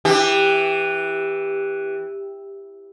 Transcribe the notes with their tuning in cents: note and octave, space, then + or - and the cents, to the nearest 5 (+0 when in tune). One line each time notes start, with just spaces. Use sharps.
E3 -5 G4 +15